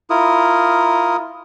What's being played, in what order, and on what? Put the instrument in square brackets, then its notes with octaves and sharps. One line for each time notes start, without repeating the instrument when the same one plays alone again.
[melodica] E4 F4 A#4 D#6